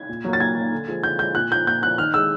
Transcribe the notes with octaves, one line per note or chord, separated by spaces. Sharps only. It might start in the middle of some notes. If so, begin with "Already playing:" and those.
Already playing: G#6
A#2
F#3 A#3
A6
A#2 G#6
F#3 A#3
D3
F3 G#3
D3 G6
F3 G#3 G6
A#2 F#6
F3 A#3 G6
A#2 G6
F3 A#3 F#6
D#3 F6
G#3 E6